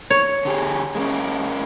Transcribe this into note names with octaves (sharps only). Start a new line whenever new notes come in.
C#5
D3 G4 G#4
G#3 A#3 C#4